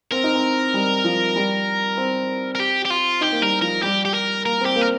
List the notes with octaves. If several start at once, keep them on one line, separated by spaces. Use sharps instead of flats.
C4 A#4
D#4
C4
G3
F3
G3
C4
A#4
G4
G4
F4
D#4 G4
A#3
G3 A#4
F3 A#4
G3 G4
G4
A#4
A#3 A#4
C4 G4
A#3
A#4